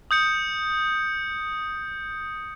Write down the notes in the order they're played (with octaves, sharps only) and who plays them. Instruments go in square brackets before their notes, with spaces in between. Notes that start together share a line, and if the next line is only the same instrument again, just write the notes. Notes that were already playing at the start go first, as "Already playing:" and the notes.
[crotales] D#6 G6 C#7